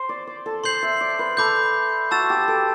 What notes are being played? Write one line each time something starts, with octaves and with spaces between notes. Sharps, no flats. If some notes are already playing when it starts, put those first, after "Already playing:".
Already playing: C5
D5
D5
A4
C5 C6 G6 C7 F#7
E5
D5
B4
A4 B5 D6 G6
F#4 A5 E6 A6 E7
G4
A4